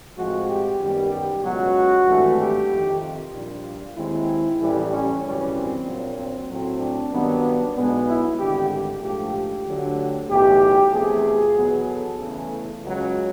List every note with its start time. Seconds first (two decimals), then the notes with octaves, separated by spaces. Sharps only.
0.17 A2 F3 G#3 C4 F#4
0.48 G4
0.80 F#2 D#3 G3 B3
1.12 G4
1.43 C#2 B2 F#3 F#4
2.06 G#1 G2 E3 A3
2.39 G4
2.69 F2 C3 D#3
3.02 F4
3.33 A#1 A#2 G3
3.96 D#2 D#3 G#3 C4 E4
4.60 A1 A2 E3 G3
4.91 C#4
5.23 G#1 F#2 C#3 E3 G3 C#4
5.55 C4
5.86 A#1 A#2 F#3
6.18 C4
6.49 A2 F#3 A3 C4
6.80 D4
7.12 G2 D#3 F#3 B3
7.76 B1 B2 G#3 B3
8.08 E4
8.39 G#1 G2 D3 G4
8.70 G4
9.02 A#1 G#2 F3 A3 G4
9.33 G4
9.65 D2 D3 F#3
10.29 B1 A2 E3 G4
10.91 E2 C3 F3 A3 G#4
11.55 E2 B2 F#3 B3
11.87 A4
12.18 E2 C#3 E3 A3
12.82 C#2 C#3 F#3